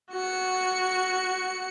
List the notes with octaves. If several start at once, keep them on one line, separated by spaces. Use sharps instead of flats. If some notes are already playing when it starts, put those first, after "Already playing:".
F#4 C#7